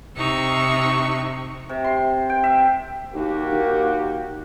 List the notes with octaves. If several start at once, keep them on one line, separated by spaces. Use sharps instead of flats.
C3 D#4 C#6 E6
C3
C6
G5
E5
D#2 A#3 F#4 G4
D#2